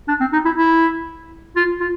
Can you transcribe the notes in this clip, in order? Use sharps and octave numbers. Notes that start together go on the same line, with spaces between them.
D4
C4
D#4
E4
E4
F4
F4